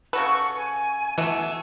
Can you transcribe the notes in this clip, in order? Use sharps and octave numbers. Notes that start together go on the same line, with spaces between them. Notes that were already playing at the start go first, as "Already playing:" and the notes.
C#3 F#4 A4 B4 C#6
G#5
B2 E3 A3